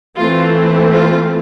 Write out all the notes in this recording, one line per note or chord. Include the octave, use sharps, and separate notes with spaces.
E3 A3 C4 F4
F4